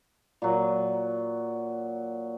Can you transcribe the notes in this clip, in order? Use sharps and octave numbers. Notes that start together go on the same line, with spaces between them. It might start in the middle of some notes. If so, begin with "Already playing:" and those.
A#2 F#3